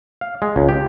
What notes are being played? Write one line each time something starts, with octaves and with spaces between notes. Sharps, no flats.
F5
G#3
C#2
G4